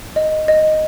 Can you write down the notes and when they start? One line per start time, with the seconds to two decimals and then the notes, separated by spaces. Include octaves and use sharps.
0.16 D#5
0.48 D#5